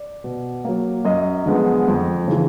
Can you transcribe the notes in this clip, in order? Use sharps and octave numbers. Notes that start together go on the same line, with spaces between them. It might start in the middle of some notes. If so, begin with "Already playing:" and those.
Already playing: D5
B2
F#3 A#3
F#2 D#5
D3 F3 G#3 B3
F2
C#3 E3